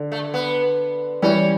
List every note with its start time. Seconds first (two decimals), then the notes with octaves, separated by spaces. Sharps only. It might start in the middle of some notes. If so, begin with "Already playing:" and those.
Already playing: D3
0.12 A3
0.34 B3
1.22 E3 G3 C#4